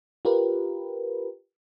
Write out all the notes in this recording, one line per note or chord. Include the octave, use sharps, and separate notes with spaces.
F4 G4 A#4 B4